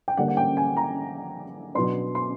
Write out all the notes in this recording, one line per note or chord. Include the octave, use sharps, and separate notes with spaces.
G5
D3 G3 A#3 D4 F#5
F#5
G5
G#5
A#5
B2 F#3 B3 D4 C6
C6